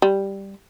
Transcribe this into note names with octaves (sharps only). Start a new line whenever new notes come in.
G3